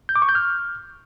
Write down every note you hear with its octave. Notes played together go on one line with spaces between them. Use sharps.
G6
D6
C#6
G6
F6